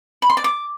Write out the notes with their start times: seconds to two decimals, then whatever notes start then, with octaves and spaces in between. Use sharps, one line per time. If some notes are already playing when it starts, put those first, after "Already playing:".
0.22 B5
0.30 C6
0.37 D5
0.44 D6